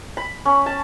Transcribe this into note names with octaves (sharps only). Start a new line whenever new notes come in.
B5
C#4
A5